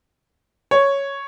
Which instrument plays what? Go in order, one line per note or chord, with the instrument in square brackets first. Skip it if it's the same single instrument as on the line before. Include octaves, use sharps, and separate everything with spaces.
[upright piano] C#5